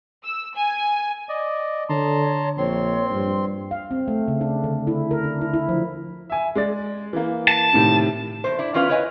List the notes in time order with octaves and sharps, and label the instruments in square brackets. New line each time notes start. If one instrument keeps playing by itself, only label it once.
[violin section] E6
G#5
[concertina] D5 D#5
[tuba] D3 [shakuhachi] C#5 [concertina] A5 A#5 C6
[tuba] A#1 [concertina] C4 C6 [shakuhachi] C#5
[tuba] G2 [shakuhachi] F4
[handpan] F5
C4
A3
C#3
D4
D3
E4
A#4
D4
E4
E4
F3
[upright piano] E5 G#5
G#3 D5 A6
E3 A#3
[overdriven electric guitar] A5
[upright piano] A2 C3 D#3
[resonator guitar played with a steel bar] E2 C5
D4 E4
E2 C#4 F4 B4 F5
E4 B4 C#5 D#5 G#5